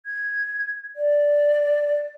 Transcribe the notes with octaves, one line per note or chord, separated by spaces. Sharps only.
G#6
D5